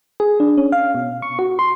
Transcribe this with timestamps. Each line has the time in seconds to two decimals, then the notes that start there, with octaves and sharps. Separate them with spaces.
0.20 G#4
0.40 D4
0.58 C#4
0.72 F5
0.95 B2
1.22 C#6
1.39 F#4
1.59 C6